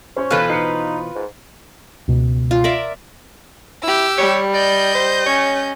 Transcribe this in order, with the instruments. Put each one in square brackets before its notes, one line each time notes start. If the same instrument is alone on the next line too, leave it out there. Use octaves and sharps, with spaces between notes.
[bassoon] C#4 [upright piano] C5 C#5 C#6
[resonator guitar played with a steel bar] B2 E3 C5 [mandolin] F4 B4 [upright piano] A4
[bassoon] D#4 [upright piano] C7 C#7
[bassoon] G#2
[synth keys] C#2 B2
[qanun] F4
A#4 D5 E5
[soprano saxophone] E4 [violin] G4 E6
[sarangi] G3 [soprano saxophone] C#5
[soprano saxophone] D5 [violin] D#5 G6
[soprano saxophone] C5
[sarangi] C#4 [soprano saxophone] C#5